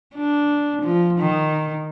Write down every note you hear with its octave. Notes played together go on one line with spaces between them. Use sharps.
D4
F3
D#3